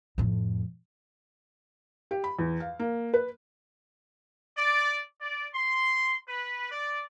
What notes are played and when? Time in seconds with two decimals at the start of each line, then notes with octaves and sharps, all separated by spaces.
0.18 F2 A2
2.11 G4
2.24 B5
2.39 E2
2.60 F5
2.79 A#3
3.14 B4
4.57 D5
5.21 D5
5.55 C6
6.28 B4
6.72 D5